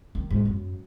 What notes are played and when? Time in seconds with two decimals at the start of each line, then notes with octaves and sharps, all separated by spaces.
0.15 D#3
0.31 G#2
0.45 F#2